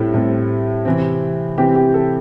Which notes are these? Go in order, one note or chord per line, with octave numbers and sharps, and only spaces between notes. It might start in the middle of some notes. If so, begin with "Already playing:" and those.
Already playing: A2 G3 C4 E4 A4
A2 G3 C4
C3 E3 C4
C3 E3 C4 G4
G4
A4